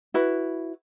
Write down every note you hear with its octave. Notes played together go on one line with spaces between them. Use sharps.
E4 F#4 B4